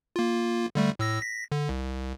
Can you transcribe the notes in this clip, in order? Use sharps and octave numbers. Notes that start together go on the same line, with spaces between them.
A#3 F4
D3 G3 A3
A2 E6 A#6
A#6 B6
D3
C2